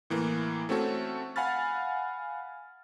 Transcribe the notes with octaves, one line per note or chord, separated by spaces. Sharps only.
A2 E3 A#3
A3 C4 C#4 F#4 A4
F5 F#5 G#5 B5 F6 A6